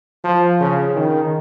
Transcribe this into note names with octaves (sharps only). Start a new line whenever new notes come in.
F3
C#3
D#3